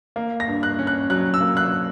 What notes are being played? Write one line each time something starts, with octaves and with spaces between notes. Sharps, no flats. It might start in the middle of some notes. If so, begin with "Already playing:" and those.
A#3
A#6
G2
F#6
C#4
F#6
F#3 F#6
E6
A#3
F#6